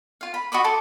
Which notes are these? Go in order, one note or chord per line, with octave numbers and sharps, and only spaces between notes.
F4 F5
B5
F#4 D#5 B5 D6
A4 C6 D6